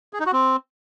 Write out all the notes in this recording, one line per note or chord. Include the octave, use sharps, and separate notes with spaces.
G#4
D#4
F#4
C4